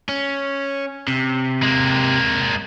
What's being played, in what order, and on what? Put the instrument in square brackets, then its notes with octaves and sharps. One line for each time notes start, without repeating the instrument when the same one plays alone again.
[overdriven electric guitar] C#4
C3
[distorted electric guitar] G#3 A#3